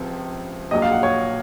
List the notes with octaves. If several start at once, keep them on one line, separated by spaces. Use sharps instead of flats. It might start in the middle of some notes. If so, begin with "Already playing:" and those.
Already playing: C#2 C3 F3
A#1 A#2 F#3 D#5
F5
F#5
C#5